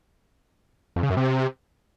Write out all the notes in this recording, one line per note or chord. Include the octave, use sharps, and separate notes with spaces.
F2
C#3
F#2
C3